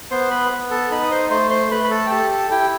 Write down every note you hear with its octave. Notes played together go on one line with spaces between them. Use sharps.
B3 C5 C6
B4 B5
B3
A4 A5
D#4 B4 B5
D#6
C5 C6
A3 C5 C6
C5 C6
A3 B4 B5
B5
A4 A5
G5
G4 A4 A5
A4 A5
E4 G4 G5